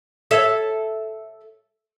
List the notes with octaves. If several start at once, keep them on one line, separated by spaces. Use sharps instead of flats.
A4 C#5 E5